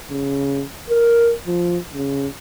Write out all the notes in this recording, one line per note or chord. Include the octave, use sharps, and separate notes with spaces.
C#3
A#4
F3
C#3